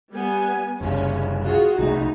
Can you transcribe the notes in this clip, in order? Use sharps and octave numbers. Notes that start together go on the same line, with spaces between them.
G3 B3 G#5
F#1 C2 C#3 C#4
F4 F#4 G#4
C2 A3 D#4